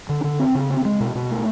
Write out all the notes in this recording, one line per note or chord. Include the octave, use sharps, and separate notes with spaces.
D3
D3
C4
C#3
C4
G#3
B2
B2
A3